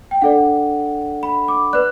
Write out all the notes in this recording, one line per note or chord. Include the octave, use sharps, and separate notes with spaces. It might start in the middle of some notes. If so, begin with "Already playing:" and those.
G5
D4 A4 D5 F#5
B5
D6
B4 D5 F#6